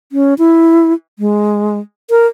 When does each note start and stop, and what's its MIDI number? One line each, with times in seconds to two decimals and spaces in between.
0.12 0.34 61
0.38 0.93 64
1.19 1.79 56
2.10 2.27 70